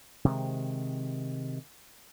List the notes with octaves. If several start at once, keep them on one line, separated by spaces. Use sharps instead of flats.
C3 D#3 G#3